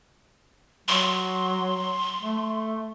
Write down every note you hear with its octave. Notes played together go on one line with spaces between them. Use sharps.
F#3 C6
A3